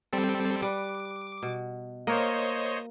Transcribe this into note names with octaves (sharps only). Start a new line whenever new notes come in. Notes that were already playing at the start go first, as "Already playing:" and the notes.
G3 C4 A4
G3 B4 D6
B2
A#3 C5 C#5 D#5